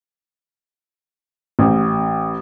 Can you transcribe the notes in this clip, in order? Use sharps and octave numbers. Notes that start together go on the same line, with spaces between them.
A1